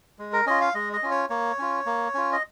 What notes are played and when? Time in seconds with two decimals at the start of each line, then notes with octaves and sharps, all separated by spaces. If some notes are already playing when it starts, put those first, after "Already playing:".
0.19 G#3
0.33 A#4
0.46 C#4 F4 D#5
0.61 F5
0.74 G#3 D#5
0.93 D#5
1.03 C#4 F4
1.11 C#5
1.30 A#3 C#5
1.59 C#4 F4
1.86 A#3
2.14 C#4 F4
2.33 D#5